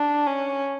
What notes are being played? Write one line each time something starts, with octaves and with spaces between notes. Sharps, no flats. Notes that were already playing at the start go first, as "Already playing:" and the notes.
Already playing: D4
C#4